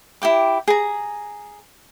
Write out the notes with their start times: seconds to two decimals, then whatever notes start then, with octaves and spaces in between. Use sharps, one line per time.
0.22 E4 G4 G5 D6
0.68 G#4 A#5